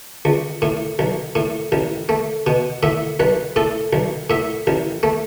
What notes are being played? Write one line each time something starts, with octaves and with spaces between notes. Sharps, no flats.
C#2
A2
B1
A2
A1
A3
B2
A2 E5
B1 B4
A2 A4
B1
A2 E5
A1
A3